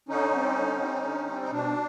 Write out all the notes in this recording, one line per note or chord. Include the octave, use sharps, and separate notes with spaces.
D3 C#4 D#4
G3 C4
D3
G3 C4
D3
G3 C4
D#4
B2 D4